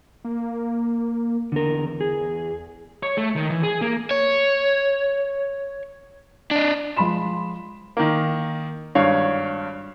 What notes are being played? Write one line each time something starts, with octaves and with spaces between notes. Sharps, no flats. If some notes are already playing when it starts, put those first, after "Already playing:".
A#3
E2 D3 A#4
G#4
C#5
A3
D#3
E3
G#4
A#3
C#5
D4 D#5
F3 G#3 B5 C6 E7
D#3 A#3
G#1 G2 C#5 F5